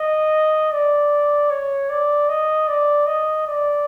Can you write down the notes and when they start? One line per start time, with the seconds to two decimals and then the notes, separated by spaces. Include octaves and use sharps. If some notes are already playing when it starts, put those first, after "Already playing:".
Already playing: D#5
0.72 D5
1.50 C#5
1.90 D5
2.29 D#5
2.67 D5
3.06 D#5
3.46 D5